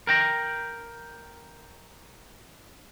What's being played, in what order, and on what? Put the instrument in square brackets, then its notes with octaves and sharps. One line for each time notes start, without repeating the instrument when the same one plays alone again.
[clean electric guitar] A#4 G5 A#5